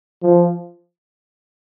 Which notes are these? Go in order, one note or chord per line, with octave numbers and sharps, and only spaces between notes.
F3